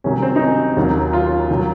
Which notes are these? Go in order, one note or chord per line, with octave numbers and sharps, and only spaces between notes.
C2 C3 D#3 F#3 C#4
C4
D#4
C#4
D#2 D#3 F#3
F4
D#3 F#3